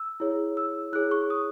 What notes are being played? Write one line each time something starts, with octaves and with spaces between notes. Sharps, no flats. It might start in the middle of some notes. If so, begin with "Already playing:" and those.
Already playing: E6
E4 G#4 C#5
E6
E4 G#4 C#5 F#6
C#6
D#6